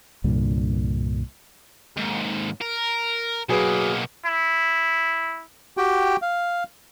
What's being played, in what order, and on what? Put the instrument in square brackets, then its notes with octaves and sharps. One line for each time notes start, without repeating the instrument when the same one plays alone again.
[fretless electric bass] C2 G2 A#2 D3
[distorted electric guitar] D#2 G#2
A#4
[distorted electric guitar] B2 A#3 [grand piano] F#3 G#4 B4
[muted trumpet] E4
[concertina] F#4 G4 G5
F5